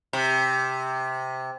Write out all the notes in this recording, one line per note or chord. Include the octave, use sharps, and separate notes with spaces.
C3